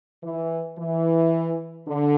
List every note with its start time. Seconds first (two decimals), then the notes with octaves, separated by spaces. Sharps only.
0.23 E3
0.78 E3
1.87 D3